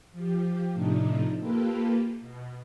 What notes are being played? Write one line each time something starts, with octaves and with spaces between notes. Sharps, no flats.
F3 G4
A2 C3 F3 A3 D4 D#4
A#3 F4 G4 A4 B4
B2